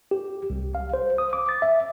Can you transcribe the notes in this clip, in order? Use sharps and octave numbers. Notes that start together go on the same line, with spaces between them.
G4
C2
F5
C5
D#6
D6
A6
E5